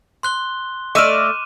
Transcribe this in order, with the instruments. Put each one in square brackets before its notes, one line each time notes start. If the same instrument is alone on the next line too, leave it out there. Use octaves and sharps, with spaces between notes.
[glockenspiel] C6 F#6 G7
[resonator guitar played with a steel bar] A3 D5 [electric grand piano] D#5 E6 F6 [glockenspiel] D6 D#7 E7